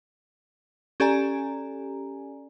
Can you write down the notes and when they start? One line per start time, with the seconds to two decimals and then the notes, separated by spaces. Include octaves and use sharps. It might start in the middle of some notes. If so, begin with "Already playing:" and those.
1.00 C#4 G4 A4 D5 G#5 A#5